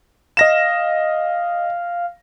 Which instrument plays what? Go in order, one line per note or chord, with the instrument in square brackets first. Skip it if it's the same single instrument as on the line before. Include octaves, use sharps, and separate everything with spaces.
[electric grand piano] D#5 A#6 E7 [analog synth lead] F5